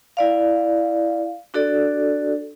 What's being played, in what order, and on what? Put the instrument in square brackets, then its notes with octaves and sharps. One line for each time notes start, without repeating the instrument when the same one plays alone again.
[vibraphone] E4 D5 F5
D4 F#4 A4 D5